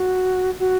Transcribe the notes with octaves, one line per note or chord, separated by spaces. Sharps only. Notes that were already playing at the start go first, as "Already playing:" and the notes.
Already playing: F#4
F#4